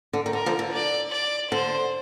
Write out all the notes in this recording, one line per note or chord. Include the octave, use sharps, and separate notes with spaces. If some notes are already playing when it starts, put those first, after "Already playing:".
D3
D#3
D3 A#4
D3 F3
D3
D5
D5
D3 C5